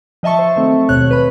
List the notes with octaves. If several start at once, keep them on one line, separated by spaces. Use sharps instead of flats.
F3 D#5 E5 A5 C#6
C5
D#3 F#3 A3 C4
D#2 B2 C#5 F#6
B4 B5